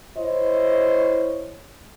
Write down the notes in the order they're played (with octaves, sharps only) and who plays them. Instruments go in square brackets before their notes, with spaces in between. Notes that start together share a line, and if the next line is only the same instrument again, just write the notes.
[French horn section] E4 C5 C#5 D#5